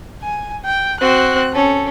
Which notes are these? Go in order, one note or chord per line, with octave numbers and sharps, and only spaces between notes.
G#5
G5
C4 F#4 F#6
C#4 A4